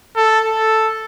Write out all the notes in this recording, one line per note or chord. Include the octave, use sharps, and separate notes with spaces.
A4
A4